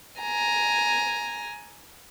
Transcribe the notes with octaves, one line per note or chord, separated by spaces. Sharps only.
G#5 A#5